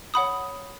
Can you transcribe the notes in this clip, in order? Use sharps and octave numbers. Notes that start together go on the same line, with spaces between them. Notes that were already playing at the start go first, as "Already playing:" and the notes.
C#5 F#5 B5 D#6